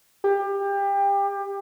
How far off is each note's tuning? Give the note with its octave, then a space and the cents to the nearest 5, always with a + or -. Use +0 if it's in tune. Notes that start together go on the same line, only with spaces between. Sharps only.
G4 +25